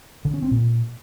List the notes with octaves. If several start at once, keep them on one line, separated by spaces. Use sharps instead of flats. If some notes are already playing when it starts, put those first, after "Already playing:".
D3
C#4
C4
A#2